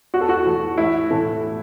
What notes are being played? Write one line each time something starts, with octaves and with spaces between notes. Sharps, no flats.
E2 F#4
A4
F#4
E3 A3
A1 E4
A2 E3 A3